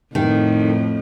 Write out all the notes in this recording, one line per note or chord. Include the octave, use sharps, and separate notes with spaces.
F2 A2 D#3